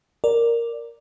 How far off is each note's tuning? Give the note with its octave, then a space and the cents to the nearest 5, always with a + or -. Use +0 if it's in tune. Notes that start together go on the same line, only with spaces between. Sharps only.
A#4 +0 D5 +0